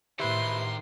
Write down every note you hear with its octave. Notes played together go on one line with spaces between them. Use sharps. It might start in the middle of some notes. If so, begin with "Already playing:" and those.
A2 D#3 E4 G4 B4 C5 C6